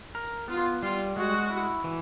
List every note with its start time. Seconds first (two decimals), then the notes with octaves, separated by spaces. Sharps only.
0.15 A#4
0.48 B3 F4
0.82 G3 F4
1.16 G#3 F#4
1.50 E4
1.84 E3